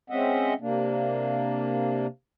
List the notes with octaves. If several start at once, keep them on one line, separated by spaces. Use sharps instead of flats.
G#3 C4 C#4 D#5 E5 F#5
C3 A#3 D4